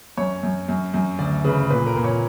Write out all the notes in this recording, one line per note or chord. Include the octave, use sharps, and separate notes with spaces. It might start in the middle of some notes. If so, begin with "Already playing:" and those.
F#2 C#5
F#2
F#2
F#2
D2 D5
C#3 B4
A#2 B4
A#4
A#2
C#5